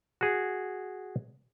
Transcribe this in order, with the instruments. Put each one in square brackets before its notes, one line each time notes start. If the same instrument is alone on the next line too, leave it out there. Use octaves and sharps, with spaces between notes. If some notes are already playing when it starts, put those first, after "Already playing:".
[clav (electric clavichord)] F#4 G#4